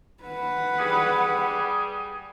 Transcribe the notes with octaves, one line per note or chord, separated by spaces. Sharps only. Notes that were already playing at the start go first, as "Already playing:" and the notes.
B4 F#5
G3 G#4